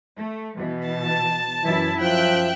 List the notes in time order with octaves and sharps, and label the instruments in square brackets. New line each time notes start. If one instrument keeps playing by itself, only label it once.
[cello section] A3
B2 E3
[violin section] A5
[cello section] F#2 E4 [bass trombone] E3
[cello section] F#2 [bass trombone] F3 [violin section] E5 G5 F#6